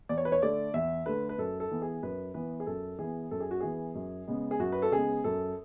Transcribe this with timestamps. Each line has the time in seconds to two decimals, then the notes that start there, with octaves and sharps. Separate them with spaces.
0.09 E2 D5
0.18 C#5
0.25 B4
0.32 C#5
0.42 D3 A3 D5
0.74 E2 E5
1.06 D3 A3 B4
1.29 B4
1.38 F#2 A4
1.60 A4
1.71 E3 B3
1.82 G#4
2.03 F#2 B4
2.34 E3 B3 B4
2.60 G#4
2.67 F#2 A4
2.99 E3 G#4
3.04 B3
3.31 F#2 A4
3.40 G#4
3.51 F#4
3.60 E3 B3 G#4
3.95 F#2
4.27 C#3 G#3 B3
4.51 G#4
4.60 F#2 F#4
4.72 B4
4.82 A4
4.92 C#3 G#3 B3 G#4
5.24 F#2 A4